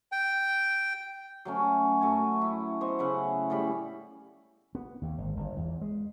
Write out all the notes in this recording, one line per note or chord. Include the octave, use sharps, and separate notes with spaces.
G5
F#3 A3 C#4
F#2 A3 F#4 G#5
E4
B3 C5 D#5 C#6
C#3 E4 E5 F#5
A2 C#3 G3 B5
B3
D#2
G#1
G1
E2
G#3